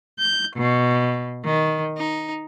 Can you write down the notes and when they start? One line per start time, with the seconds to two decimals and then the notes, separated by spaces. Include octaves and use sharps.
0.19 G6
0.56 B2
1.45 D#3
1.97 D#4